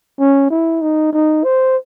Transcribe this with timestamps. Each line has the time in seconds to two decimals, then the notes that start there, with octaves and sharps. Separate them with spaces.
0.20 C#4
0.50 E4
0.82 D#4
1.13 D#4
1.44 C5